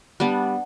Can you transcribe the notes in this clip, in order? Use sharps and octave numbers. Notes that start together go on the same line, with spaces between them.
G3 B3 D4